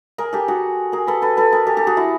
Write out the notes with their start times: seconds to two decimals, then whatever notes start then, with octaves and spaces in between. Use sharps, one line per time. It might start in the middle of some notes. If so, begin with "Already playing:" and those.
0.18 G#4 A#4
0.33 G4 A4
0.48 F#4 G#4
0.92 G#4 A#4
1.07 A4 B4
1.22 A4 B4
1.37 A4 B4
1.52 G#4 A#4
1.67 G4 A4
1.77 G4 A4
1.87 F#4 G#4
1.97 E4 F#4